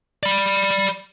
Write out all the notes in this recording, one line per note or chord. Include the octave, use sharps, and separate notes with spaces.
D5 B5